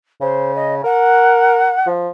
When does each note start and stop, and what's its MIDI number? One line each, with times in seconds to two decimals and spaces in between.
0.21 0.79 49
0.21 0.54 72
0.55 0.74 75
0.84 1.74 70
0.84 1.87 78
1.87 2.09 53